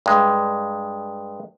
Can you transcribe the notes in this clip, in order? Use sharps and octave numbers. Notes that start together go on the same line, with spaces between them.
G2 G#3